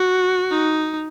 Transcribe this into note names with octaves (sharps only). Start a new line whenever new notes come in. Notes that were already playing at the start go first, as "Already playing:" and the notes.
Already playing: F#4
D#4